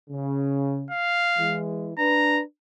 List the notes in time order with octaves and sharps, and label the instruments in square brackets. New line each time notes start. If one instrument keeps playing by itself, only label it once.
[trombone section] C#3
[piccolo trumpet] F5
[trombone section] E3 G#3
[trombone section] D4 B4 [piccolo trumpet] A#5